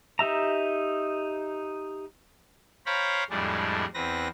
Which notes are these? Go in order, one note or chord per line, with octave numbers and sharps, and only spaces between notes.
D#4 G4 E5 A#5
C5 C#5 F5 G5 A#5 B5
F2 A2 G3 G#3 D4
E2 C4 B4 A#6